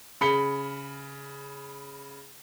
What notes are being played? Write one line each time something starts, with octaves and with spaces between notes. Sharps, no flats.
C#3 B5 C#7 G7